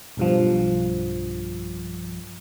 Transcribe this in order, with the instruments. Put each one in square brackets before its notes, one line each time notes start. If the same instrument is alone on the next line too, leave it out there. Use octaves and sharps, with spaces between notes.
[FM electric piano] B1 G2 F3